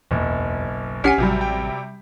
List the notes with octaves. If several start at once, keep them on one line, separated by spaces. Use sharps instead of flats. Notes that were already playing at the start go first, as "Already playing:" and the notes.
F#1 B1 E2
A#1 C#4 G4 F#5 G#5 F6 B6 C7
A1 C3 F#3 G3
G5